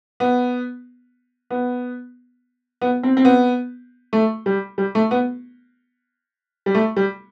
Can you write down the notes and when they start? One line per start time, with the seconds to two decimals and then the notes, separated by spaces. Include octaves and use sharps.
0.20 B3
1.51 B3
2.81 B3
3.03 C4
3.17 C4
3.25 B3
4.13 A3
4.46 G3
4.78 G3
4.95 A3
5.11 B3
6.66 G3
6.75 A3
6.96 G3